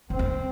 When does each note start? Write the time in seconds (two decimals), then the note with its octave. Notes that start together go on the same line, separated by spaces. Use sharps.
0.10 F2 C4
0.19 E2